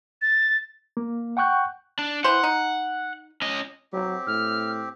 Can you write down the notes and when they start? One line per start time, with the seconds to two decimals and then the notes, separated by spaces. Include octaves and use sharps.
0.22 A6
0.97 A#3
1.37 F#5 G5 C#6 F#6 G6
1.99 D4
2.24 E3 C5 F#5
2.43 D#4
3.42 C#4 D#5
3.93 F#3 C4 G4
4.27 A2 F6